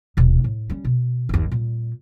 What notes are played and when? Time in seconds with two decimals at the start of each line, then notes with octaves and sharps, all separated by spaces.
0.17 D#1 B2
0.44 A2
0.70 G3 C#4
0.85 B2
1.29 G1 D#2
1.51 A#2 G3